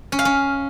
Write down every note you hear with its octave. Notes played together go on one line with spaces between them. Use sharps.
C#4
F5
C#4